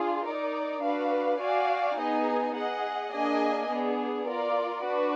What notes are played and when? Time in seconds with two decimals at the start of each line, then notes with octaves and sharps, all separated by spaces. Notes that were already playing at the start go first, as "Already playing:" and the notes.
Already playing: D4 F4 G#4
0.25 D#4 A#4 D5
0.82 D4 F#4 B4 F5
1.40 F#4 D5 F5 G#5
1.97 B3 D#4 G#4 D#5 G#5
2.54 G#4 D#5 F#5
3.11 A#3 D4 G#4 D#5 G#5
3.69 B3 D4 G#4
4.26 F4 A#4 D5
4.83 D4 F#4 B4